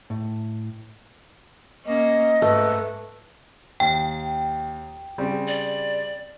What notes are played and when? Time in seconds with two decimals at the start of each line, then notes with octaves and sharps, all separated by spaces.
0.10 A2
1.86 A#3 C#4 D#5
2.42 G#2 A3 B4
3.80 D#2 G5
5.18 C#3 G3 C4
5.47 D5